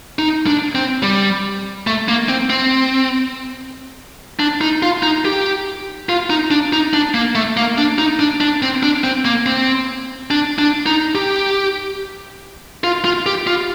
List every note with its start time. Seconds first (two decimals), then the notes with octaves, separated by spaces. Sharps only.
0.19 D#4
0.47 D4
0.75 C4
1.03 G3
1.87 A3
2.08 A#3
2.29 C4
2.50 C4
4.40 D4
4.61 D#4
4.82 F4
5.03 D#4
5.25 G4
6.09 F4
6.30 D#4
6.51 D4
6.73 D#4
6.93 D4
7.14 A#3
7.35 A3
7.57 A#3
7.78 D4
7.98 D#4
8.19 D4
8.41 D4
8.62 C4
8.83 D4
9.04 C4
9.25 A#3
9.46 C4
10.31 D4
10.59 D4
10.86 D#4
11.15 G4
12.84 F4
13.05 F4
13.26 G4
13.47 F4